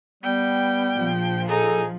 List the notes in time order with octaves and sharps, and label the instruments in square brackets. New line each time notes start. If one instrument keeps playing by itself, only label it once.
[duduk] G3 [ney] B3 [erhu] G5
[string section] A#1 F3
[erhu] D#4 [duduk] G#4 [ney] A4